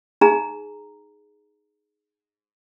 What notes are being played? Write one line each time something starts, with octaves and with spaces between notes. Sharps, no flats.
D#4 G#4 A#5